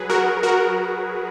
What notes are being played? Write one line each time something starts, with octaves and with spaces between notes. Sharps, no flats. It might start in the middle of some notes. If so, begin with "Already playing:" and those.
Already playing: F#3 G#4 B4
F#4 A#4
F#4 A#4